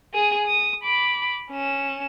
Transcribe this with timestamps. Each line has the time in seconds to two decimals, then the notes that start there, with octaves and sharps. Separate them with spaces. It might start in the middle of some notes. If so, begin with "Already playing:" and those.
0.14 G#4 D#6
0.46 D#6
0.83 B5 D6
1.51 C#4 E7